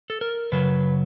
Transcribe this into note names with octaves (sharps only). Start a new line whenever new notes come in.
A4
A#4
F#2 C#3 F#3 B4